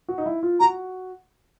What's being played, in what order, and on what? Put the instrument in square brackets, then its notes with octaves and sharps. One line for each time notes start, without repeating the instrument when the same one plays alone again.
[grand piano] F#4
D#4
E4
F4
[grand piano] F#4 [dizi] A#5